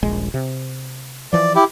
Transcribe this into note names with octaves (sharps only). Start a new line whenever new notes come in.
D#1 A#1 G#3
C3
E3 F3 D5
E4 G4